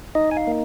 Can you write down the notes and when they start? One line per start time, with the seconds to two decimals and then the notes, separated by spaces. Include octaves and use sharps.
0.15 D#4 D#5
0.31 G#5
0.37 F5
0.47 A#3